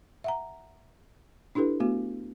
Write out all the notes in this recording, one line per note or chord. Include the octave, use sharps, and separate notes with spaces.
E5 F#5 A#5
D4 E4 G4 A4 B4
A3 B3 F#4